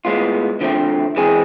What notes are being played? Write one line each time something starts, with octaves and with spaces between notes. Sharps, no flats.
A2 G#3 B3 F4
D3 F3 A3 C4
E3 G#3 C4 G#4